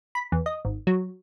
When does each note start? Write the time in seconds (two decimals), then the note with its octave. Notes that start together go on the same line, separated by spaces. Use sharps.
0.15 B5
0.32 E2
0.46 D#5
0.65 G#1
0.87 F#3